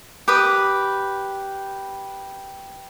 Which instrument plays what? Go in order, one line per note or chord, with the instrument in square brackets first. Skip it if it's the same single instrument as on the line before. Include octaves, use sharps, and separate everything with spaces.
[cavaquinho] G4 B4 D#6